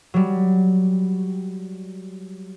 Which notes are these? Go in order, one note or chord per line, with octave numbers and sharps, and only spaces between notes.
F#3 G3